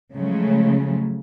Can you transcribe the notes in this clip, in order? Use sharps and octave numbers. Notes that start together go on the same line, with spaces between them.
C#3 F3 F#3 G#3 A3